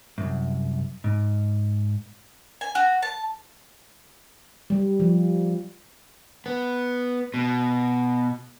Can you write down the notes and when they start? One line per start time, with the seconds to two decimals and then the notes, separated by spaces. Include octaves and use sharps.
0.18 C2 F#2
1.04 G#2
2.61 G#5
2.75 F#4
3.02 A5
4.70 G3
5.00 F3
6.46 B3
7.34 B2